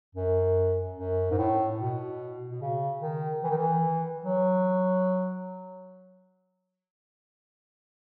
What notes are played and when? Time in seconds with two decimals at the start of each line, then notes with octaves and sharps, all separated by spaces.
0.15 F#2
0.97 F#2
1.30 G#2
1.38 A2
1.79 B2
2.51 B2
2.62 C#3
3.02 D#3
3.44 E3
3.50 D#3
3.58 E3
4.25 F#3